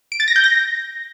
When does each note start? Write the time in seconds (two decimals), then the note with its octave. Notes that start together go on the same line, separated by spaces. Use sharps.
0.12 D7
0.20 A6
0.28 A#6
0.36 G6
0.44 A#6